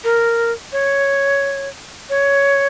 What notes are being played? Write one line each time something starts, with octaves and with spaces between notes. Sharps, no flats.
A#4
C#5
C#5